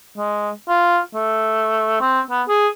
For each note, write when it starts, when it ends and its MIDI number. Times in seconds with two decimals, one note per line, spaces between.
0.17 0.50 56
0.68 0.98 65
1.14 2.00 57
2.01 2.20 60
2.30 2.42 59
2.48 2.68 68